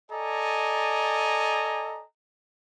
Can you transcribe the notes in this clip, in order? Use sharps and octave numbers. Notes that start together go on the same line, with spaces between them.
A4 D5 D#5 G#5 A#5